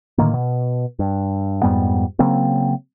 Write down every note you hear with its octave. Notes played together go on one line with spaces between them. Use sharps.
A2 D3 D#3 A#3
B2
G2
F2 G#2 G3 B3
C#3 F#3 A#3 C4